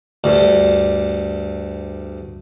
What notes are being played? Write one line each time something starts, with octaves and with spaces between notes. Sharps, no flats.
D2 G2